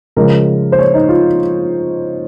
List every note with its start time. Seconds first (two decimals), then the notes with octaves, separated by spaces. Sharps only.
0.17 C#3 F3 G#3 A#4
0.72 C5
0.78 C#5
0.94 D#4
1.09 F4